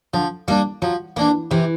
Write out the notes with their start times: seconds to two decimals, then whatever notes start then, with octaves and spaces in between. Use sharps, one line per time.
0.14 D3 F3
0.48 G3 A#3 D4
0.82 F3 F#3
1.16 E3 A#3 D4
1.51 C3 E3